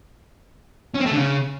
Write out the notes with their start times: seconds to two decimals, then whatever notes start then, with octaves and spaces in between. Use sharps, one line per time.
0.95 C#4
1.01 C4
1.06 A3
1.12 D3
1.18 C#3